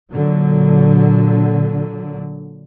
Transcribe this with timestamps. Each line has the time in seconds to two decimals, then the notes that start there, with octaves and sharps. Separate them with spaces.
0.11 A#2 D3 F#3